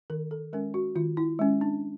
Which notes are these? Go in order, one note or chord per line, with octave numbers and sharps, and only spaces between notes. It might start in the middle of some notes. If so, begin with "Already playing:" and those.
D#3 A#4
A4
G#3 C#4 A#4
F#4
D#3 F4
E4
G#3 C#4
D4